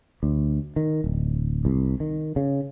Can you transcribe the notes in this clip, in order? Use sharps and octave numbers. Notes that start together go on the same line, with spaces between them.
D2
D#3
D1
C2
D#3
C#3